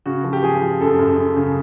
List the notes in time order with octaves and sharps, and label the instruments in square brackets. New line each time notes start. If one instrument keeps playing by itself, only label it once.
[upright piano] C#3 F#4
F3
G4
F3 G#4
F3
F#2 A4
F#2
F#2
C#3